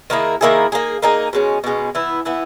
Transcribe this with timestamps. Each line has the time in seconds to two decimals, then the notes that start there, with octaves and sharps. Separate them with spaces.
0.10 D#3 A#3 E4 G#4
0.41 D#3 A#3 E4 G#4
0.72 A#3 D#4 G#4
1.02 A#3 D#4 G#4
1.33 B2 G#3 C#4
1.64 B2 G#3 C#4
1.95 E3 B3 E4
2.25 E3 B3 E4